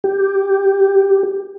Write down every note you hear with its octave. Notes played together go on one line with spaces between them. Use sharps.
G4